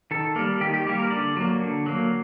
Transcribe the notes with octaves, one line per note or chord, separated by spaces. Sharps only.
D#3 A4
G3 A#3
D#3 G4
G4
G3 A#3 G4
A#4
D3 D5
F#3 A#3
D3
F#3 A#3